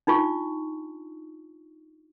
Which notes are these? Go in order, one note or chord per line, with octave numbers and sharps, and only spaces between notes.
D4 D#4 F4 C#6